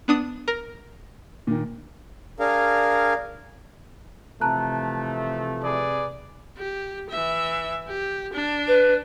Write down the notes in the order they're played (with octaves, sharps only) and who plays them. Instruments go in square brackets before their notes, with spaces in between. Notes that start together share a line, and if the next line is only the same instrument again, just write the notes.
[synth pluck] B3 D4 D#6
A#4
[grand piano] A#2 D#3
[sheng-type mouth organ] D4 G#4 A#4 F5
[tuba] C3 [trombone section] E3 F3 A3 [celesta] A5 A#5 F#6
[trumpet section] G#4 B4 D5
[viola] G4
E3 E5
G4
D4
[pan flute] B4